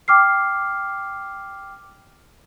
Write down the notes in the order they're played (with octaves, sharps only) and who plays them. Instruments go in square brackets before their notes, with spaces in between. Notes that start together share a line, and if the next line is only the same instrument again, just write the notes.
[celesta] G5 D6 F6 C7